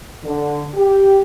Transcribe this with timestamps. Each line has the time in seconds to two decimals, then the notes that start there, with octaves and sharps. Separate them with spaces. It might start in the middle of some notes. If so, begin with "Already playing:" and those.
0.23 D3
0.75 G4